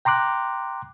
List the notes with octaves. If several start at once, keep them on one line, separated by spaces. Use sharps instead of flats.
G5 A#5 C6 D6 F#6